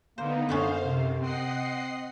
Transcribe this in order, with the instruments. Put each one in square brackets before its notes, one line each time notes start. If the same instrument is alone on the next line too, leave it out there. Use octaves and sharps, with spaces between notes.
[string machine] D3 B3 D#4 [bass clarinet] A#3 [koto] C5
[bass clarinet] F#2 [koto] D3 B3 C#4 [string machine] C5 F5
[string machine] C3
[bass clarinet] C4 [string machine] D#5 F#5 C7